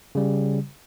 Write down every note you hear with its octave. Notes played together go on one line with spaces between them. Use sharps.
C#3 G3